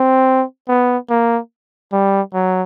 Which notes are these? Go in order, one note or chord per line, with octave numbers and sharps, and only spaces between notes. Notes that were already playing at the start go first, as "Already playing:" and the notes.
Already playing: C4
B3
A#3
G3
F#3